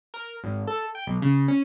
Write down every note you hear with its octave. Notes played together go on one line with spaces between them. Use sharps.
A#4
G#1
A4
G5
B1
C#3
C#4